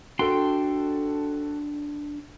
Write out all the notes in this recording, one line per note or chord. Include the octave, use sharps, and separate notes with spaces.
D4 F#4 A4 G5 C6